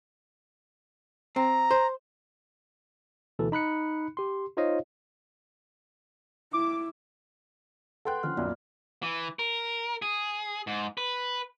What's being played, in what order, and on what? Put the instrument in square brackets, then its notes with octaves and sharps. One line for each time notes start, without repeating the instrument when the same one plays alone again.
[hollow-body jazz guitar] C4 [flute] A#5
[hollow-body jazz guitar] C5
[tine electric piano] D2 B2 E3 A4
D#4 B5 F#6 C#7
G4 C6
D#4 F4 C5 C#5 D#5 F5
[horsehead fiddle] E4 [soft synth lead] D6
[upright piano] A4 B4 G5 [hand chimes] F#5 C6 F#6
[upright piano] D3 F3 C#4 [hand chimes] F6
[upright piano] B1 F#2 A#2 [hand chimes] F4 D5
[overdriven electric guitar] E3
A#4
G#4
G#2
B4